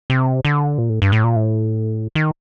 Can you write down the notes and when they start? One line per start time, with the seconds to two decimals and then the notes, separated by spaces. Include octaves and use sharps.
0.10 C3
0.45 D3
0.78 A#2
0.90 A2
1.02 G2
1.12 A2
1.24 A#2
1.36 A2
2.15 D#3